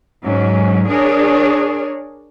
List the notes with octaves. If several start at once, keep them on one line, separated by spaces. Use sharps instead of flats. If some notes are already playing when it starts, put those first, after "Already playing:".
G#2 F#3 C#4
D4 G#4 A#4 C#5